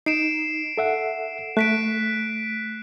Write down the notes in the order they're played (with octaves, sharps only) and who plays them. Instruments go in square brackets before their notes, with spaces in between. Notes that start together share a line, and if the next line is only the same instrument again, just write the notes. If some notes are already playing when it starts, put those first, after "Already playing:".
[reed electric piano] D#4 [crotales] C7 D7 E7
[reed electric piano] A4 E5 F#5
[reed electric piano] A3 [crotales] F#6 B6 D7